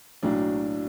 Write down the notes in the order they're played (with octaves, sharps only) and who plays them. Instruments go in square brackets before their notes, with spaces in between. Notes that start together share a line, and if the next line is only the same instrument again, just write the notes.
[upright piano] B1 A2 F#3 A#3 D4